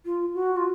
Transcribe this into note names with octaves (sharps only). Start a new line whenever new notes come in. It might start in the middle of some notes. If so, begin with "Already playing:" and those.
F4
F#4
F4